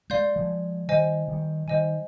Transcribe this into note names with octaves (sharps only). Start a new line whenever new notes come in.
G#3 D5 F5 C6 G6
F3 G#3
D#3 G3 C5 D#5 G#5
D#3 G3
D#3 G3 C5 D#5 G#5